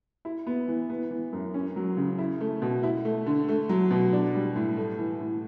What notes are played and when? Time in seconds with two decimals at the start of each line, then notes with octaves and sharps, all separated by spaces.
0.25 E4
0.46 B3
0.68 E3
0.90 B3
1.11 E3
1.33 F#2
1.54 C#4
1.76 F#3
1.97 C#3
2.19 E4
2.41 A3
2.62 B2
2.83 E4
3.05 A3
3.26 D3
3.48 A3
3.69 F#3
3.91 B2
4.13 D4
4.35 G3
4.56 A2
4.77 A3
4.99 E3
5.21 A2